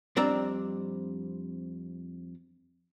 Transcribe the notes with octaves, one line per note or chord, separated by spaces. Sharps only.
F2 G3 C4 D4 D5 A#5